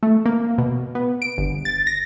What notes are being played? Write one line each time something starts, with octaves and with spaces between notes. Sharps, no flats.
A3
A#3
B2
B3
D7
G1
A6
A#6